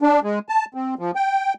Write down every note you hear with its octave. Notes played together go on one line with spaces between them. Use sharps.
D4
G#3
A5
C4
F3
G5